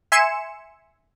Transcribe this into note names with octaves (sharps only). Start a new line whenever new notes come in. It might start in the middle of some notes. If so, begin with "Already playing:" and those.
E5 G#5 C6 C#7 E7